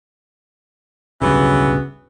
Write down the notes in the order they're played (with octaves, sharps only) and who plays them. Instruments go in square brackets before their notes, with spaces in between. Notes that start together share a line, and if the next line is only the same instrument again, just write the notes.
[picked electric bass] D1 B1 G2 [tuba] C#3 [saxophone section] E3 B3 F#4